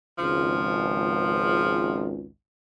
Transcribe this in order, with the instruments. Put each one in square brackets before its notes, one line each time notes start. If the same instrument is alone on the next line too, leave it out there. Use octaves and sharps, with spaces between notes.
[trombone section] G#1 C#2 [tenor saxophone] F3